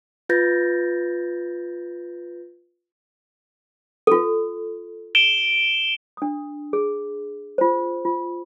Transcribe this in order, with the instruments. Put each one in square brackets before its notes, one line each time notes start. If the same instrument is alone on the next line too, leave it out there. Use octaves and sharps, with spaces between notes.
[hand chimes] F4 B4 G6 A6 A#6
[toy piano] F4 A4
[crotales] D7 E7 G7
[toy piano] D4 D#6
G#4
F4 C5
F4